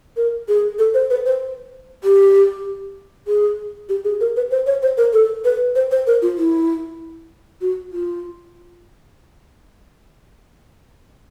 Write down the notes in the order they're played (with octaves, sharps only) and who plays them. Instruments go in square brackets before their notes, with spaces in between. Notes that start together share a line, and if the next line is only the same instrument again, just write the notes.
[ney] A#4
G#4
A4
C5
B4
C5
G4
G#4
G4
G#4
A#4
B4
C5
C#5
C5
A#4
A4
B4
C5
C5
A#4
F4
E4
F#4
F4